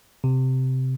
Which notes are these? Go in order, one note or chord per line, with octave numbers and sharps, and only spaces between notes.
C3